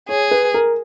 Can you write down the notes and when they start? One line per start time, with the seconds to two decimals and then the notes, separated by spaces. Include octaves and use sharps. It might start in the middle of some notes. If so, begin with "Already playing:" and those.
0.09 G#4 C#5
0.31 B4
0.54 A#4